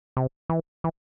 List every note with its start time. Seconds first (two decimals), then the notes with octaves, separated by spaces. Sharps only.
0.17 C3
0.49 E3
0.84 E3